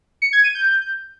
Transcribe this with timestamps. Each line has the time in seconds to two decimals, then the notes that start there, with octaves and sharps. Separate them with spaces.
0.22 C#7
0.33 G#6
0.44 D#7
0.55 G6